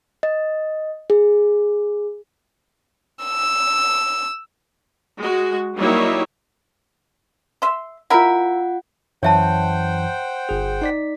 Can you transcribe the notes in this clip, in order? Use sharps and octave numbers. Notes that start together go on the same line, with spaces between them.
D#5
G#4
E6
G#3 F#4
F#3 G3 A#3 D#4 E4 C#5
E5 C6
E4 F4 A#4 E5 F#5
F#2 E3 C5 C#5 E5 F#5 G5 A5
G1 G#4
D#4 D5 B6